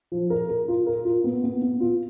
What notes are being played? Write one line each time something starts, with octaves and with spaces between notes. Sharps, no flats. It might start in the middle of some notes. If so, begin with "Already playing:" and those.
F3
A#4
A#4
F4
A#4
F4
B3
B3
B3
F4